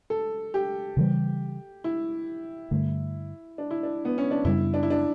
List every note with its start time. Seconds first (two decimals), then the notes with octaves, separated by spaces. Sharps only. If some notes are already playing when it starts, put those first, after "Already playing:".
0.10 A4
0.54 G4
0.97 C#3 E3 G3
1.84 E4
2.71 G2 D3 A3
3.58 D4
3.71 E4
3.83 D4
4.05 B3
4.18 C#4
4.31 D4
4.45 F#2 C#3 G3 B3 E4
4.74 D4
4.83 E4
4.90 D4